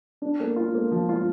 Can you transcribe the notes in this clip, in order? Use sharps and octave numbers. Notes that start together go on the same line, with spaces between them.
D4
A#3
F4
A#3
F3
F4